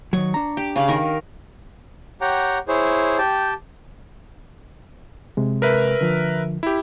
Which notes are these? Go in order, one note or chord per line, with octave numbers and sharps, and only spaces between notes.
D#3 F#3 C#6
D4 A#5
G4
C#3 F5 B5
D#3 A#4
G4 C#5 F#5 G5 A#5
E4 G#4 C5 C#5
G4 G5 A5
C3 G#3
A#4 B4 E5
D3 F3
E4 G4